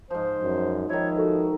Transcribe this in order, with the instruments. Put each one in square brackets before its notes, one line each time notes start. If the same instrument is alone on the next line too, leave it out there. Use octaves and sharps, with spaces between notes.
[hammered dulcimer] G#2 F3 [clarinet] C5
[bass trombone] F#2
[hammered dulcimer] D#3 E4 [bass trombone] F3 [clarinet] C#5
[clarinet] F#4 [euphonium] A4